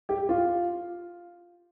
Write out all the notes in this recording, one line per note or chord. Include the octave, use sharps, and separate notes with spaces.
G4
F4